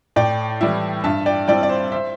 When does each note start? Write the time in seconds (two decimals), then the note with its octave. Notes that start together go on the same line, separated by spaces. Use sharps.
0.16 A2 D5 G5
0.61 E3 G3 E4
1.04 G2 E5 A5
1.26 D5 G5
1.48 G3 C4 E4 D5 G5
1.63 D5
1.69 C5
1.92 C5 E5